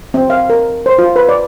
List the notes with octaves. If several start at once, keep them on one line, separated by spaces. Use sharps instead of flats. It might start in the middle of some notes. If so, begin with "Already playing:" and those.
C4
F5
A#4
C5
F4
B4
D5